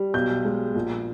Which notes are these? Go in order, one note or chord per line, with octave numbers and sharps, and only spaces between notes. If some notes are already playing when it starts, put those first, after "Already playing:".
Already playing: G3
B1 G6
G#3
A#1